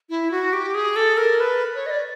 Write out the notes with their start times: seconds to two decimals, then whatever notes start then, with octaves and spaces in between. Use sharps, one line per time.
0.10 E4
0.31 F#4
0.53 G4
0.75 G#4
0.96 A4
1.17 A#4
1.40 B4
1.75 C#5
1.86 D#5
1.90 D5